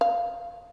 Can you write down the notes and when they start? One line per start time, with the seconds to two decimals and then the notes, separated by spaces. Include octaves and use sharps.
0.01 F5